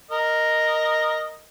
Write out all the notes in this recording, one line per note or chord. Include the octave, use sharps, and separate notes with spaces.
A#4 D#5